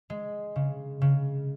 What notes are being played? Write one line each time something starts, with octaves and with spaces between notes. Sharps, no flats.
G#3
C#3
C#3